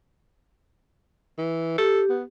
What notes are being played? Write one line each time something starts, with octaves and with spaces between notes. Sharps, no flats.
E3
G4 A4
B3